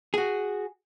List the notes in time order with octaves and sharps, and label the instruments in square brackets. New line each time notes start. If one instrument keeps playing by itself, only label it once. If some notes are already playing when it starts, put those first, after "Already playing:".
[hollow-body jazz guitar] F#4 G#4